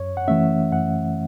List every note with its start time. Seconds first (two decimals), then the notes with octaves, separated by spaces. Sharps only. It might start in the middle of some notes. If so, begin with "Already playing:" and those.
Already playing: F#2 C#5
0.17 F#5
0.28 E3 A3 C#4 E5
0.72 F#2 F#5